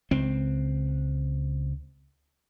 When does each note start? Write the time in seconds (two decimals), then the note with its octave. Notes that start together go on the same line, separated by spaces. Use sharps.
0.11 C#2 C4